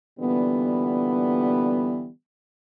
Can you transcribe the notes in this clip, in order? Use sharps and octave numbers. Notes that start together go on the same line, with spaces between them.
A#2 D3 E3 G3 B3